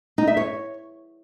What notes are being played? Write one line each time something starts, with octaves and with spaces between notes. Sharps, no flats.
D#4
E5
C#5